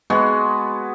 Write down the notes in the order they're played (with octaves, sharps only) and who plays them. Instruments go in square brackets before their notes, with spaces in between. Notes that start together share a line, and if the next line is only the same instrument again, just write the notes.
[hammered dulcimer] G#3 B3 F#4